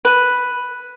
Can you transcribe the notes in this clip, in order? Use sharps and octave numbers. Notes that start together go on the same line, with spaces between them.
B4 F#6 D#7